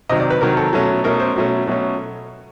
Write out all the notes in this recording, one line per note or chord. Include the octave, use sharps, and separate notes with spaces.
C3 D#3 F#3 D#5
D5
B4
C3 D#3 F#3 A#4
A4
B2 F#3 A3 C#4
B2 F#3 A3 C#4 A#4
C5
B2 F#3 A3 C#4
B2 F#3 A3 C#4